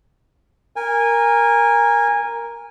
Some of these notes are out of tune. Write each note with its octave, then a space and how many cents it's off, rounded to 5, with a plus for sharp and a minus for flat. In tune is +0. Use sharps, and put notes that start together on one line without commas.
A#4 +0 G#5 -20